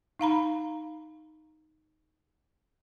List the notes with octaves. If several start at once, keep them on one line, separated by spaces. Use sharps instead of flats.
D#4 F5 A#5 B5